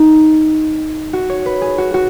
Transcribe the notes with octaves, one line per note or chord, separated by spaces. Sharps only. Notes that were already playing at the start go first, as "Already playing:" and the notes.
Already playing: D#4
F#4
C#5
B4
G#4
F#4
F#4